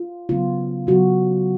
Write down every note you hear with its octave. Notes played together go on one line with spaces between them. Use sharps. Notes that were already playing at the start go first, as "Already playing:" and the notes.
Already playing: F4
C#3 F#3 B3 F4
C#3 F#3 B3 F#4